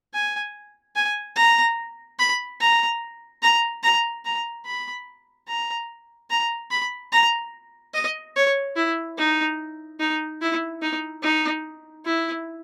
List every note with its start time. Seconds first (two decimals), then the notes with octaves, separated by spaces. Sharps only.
0.13 G#5
0.96 G#5
1.36 A#5
2.19 B5
2.61 A#5
3.42 A#5
3.83 A#5
4.25 A#5
4.65 B5
5.48 A#5
6.30 A#5
6.71 B5
7.12 A#5
7.94 D#5
8.36 C#5
8.76 E4
9.18 D#4
10.00 D#4
10.41 E4
10.82 D#4
11.22 D#4
12.05 E4